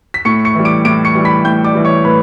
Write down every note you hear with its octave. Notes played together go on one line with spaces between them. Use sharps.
B6
A2 C#6 C#7
C#6 C#7
E3 G3
D6 D7
A2 D6 D7
C#6 C#7
E3 G3
B5 B6
A2 G5 G6
D5 D6
E3 G3
C#5 C#6
A2 B4 B5